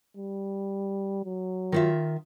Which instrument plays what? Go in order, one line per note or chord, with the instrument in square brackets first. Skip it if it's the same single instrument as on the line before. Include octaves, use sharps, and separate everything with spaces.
[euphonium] G3
F#3
[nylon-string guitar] D#3 F4 E5